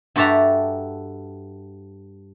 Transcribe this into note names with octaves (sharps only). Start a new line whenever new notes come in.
G2 F#4 G4 A4 E5 A#5